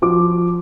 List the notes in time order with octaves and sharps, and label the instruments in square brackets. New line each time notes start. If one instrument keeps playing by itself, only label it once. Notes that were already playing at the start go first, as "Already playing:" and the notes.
[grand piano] F3 D6